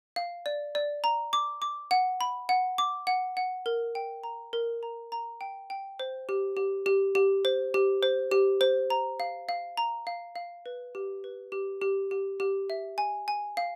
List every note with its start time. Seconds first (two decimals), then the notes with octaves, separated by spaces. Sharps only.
0.16 F5
0.46 D5
0.75 D5
1.04 A#5
1.33 D6
1.62 D6
1.91 F#5
2.21 B5
2.49 F#5
2.78 D6
3.07 F#5
3.37 F#5
3.66 A#4
3.95 G5
4.24 A#5
4.53 A#4
4.83 A#5
5.12 A#5
5.41 G5
5.70 G5
6.00 C5
6.29 G4
6.57 G4
6.86 G4
7.15 G4
7.45 C5
7.74 G4
8.03 C5
8.31 G4
8.61 C5
8.90 A#5
9.20 F5
9.49 F5
9.77 A#5
10.07 F5
10.36 F5
10.66 B4
10.95 G4
11.24 B4
11.52 G4
11.82 G4
12.11 G4
12.40 G4
12.70 E5
12.98 G#5
13.28 G#5
13.57 F5